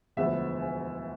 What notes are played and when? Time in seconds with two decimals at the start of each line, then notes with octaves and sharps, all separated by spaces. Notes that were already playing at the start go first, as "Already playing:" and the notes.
0.17 E1 D2 D3 F3 B3 E5
0.59 G#5